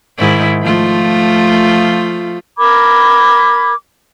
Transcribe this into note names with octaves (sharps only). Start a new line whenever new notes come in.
G#2 D#3 E4
F3 A3 F4
A#4 B5 D6 G#6